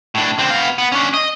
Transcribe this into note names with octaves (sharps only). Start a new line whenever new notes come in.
A2 D4
D3 C4
B3 F5
B3
C#4 D4
D#5